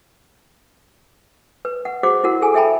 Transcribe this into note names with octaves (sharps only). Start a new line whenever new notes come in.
B4
F#5
F#4 G#4 C5 F#5 D6
E4 F#4 A#4 F#5
G#4 A4 G#5
A4 E5 G5 A5 B5